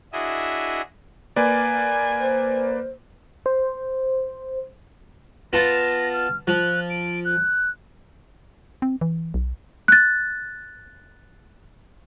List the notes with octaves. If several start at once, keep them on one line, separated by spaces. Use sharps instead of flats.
D4 E4 F#4 G#4 D#5 E5
A#3 B4 D5 G#5
C5
C5
B3 F4 A5 A#6
F6
F3 F#6
D7
F#6
C4
E3
B1
F#6 A6